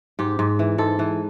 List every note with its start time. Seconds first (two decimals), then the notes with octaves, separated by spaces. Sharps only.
0.19 G#2 G4
0.39 G#2
0.59 E3
0.78 G#2 A4
0.99 E3